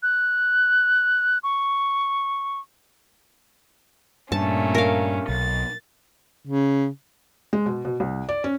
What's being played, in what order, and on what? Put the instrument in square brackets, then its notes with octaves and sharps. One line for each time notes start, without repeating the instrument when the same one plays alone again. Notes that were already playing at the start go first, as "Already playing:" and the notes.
[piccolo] F#6
C#6
[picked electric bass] G2 [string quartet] A#2 A3 C#4 [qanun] A5
[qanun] A#4 F5
[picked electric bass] B1 [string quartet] A6
[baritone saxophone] C#3
[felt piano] G#3
B2
B2
C2
D5
C#4